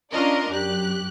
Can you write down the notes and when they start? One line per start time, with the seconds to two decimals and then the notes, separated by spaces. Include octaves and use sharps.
0.12 C#4 D4 F4 A#4 D5 D#5
0.51 F#2 G4 F#6